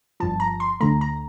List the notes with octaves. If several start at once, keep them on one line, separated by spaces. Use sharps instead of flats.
G1 G2 F3 A5
A#5
C6
D2 D3 A3 A#5
A#5